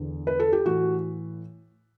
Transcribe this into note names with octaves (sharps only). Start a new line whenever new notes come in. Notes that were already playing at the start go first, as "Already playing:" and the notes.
Already playing: E2 D3
B4
A4
G4
A2 E3 F#4